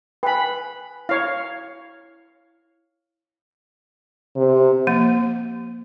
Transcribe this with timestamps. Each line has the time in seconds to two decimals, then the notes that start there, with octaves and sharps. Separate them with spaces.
0.23 B4 G5 G#5 B5
1.09 E4 C#5 F5
4.36 C3
4.87 F3 A#3